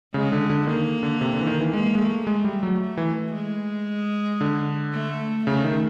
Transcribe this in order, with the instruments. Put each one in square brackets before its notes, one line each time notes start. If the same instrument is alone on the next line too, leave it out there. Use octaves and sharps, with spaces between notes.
[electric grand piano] C#3 [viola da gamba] G#3
[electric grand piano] D3
D3
[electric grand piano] D#3 [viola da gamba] A#3
[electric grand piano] D3
C3
D3
E3
D#3
E3
[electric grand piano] G#3 [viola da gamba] A#3
[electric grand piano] G#3
A3
[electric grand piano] G#3 [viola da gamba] A3
[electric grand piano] G3
F#3
[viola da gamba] A3
[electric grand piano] E3
[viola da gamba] G#3
[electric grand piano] D3
[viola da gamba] A3
[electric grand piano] C#3 [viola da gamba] A3
[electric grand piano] D#3